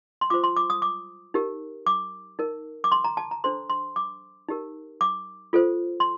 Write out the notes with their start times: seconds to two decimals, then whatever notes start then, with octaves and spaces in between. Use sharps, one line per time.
0.21 C6
0.30 F4 C5 D6
0.44 C6
0.57 D6
0.70 D#6
0.82 D6
1.34 D#4 G4 A#4
1.87 D6
2.39 D#4 A#4
2.84 D6
2.92 C6
3.04 A#5
3.17 A5
3.31 A#5
3.44 D4 A4 C5 C6
3.70 C6
3.96 D6
4.49 D#4 G4 A#4
5.01 D6
5.53 F4 A4 C5
6.00 C6